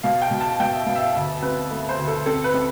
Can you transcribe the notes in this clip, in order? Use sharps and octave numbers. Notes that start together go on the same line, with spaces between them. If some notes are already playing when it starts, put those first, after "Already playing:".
B2 F5
G5
B2
A5
B2 G5
E5
B2 F5
E5
F5
D2 E5
C4 B4
A3
C5
D2
A4
C4 A4
B4
C4